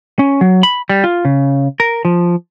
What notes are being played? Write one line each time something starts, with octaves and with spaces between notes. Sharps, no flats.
C#4
F#3
B5
G3
F4
C#3
A#4
F3